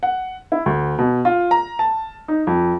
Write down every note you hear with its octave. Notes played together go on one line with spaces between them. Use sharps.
F#5
E4
D2
B2
F4
A#5
A5
D#4
F2